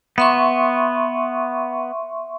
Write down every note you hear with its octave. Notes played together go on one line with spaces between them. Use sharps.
B3 E5 C6 C#6